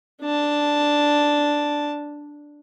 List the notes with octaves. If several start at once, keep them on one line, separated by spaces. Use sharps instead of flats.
D4 A5